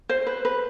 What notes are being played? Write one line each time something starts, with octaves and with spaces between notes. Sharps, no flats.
C5
B4
B4